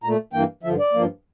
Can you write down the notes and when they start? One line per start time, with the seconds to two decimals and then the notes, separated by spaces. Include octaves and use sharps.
0.03 A#2 A3 A#5
0.33 G2 E3 A#3 G5
0.63 G2 D3 F3 E5
0.79 D5
0.93 G2 F3 A#3